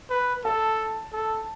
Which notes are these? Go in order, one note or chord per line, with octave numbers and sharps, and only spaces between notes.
B4
A4 A5
A4